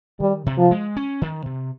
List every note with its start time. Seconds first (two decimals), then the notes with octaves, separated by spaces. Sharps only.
0.20 D#3 G3
0.46 C3
0.58 F3
0.71 G#3
0.96 C#4
1.22 D#3
1.46 C3